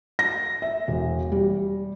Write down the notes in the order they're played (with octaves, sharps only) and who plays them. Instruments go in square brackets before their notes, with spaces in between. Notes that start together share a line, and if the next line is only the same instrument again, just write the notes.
[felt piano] A#6
E5
E1
G3